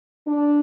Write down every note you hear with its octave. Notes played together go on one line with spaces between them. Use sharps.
D4